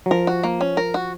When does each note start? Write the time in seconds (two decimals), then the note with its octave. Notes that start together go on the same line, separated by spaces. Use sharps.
0.06 F#3
0.11 F3 A#4
0.27 F#4
0.43 A#3
0.61 C#4
0.77 A#4
0.94 F#4